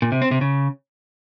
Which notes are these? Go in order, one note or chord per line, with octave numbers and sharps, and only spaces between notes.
A#2
C3
C4
C3
C#3